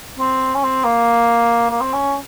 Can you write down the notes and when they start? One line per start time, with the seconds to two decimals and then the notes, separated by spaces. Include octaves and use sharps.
0.19 C4
0.55 C#4
0.63 C4
0.84 A#3
1.70 A#3
1.81 C4
1.93 C#4